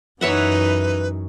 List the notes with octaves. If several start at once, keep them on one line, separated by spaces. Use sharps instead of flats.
F#2 E3 D#4 B4 C#5 E5 F#5